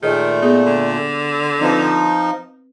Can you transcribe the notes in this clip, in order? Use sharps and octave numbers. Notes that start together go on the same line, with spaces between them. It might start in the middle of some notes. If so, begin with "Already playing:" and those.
A#2 D#3 A3 G#4 C#5 D#5
B3 D#4 G#4
D3
F3 C4 D#4 B4